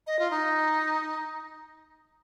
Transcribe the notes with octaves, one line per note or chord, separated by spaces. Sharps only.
D#5
F4
D#4